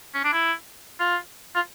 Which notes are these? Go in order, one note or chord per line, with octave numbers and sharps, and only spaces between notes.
C#4
D4
E4
F4
F4